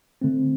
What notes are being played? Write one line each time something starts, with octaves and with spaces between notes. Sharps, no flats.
D3 A3 C4